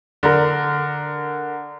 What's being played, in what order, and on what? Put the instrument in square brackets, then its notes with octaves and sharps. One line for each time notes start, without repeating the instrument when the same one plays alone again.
[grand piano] D3 A#4